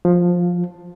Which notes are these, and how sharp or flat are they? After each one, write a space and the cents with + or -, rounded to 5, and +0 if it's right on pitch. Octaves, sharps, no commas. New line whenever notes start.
F3 +15